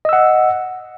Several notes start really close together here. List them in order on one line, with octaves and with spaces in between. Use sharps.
D#5 E6 F#5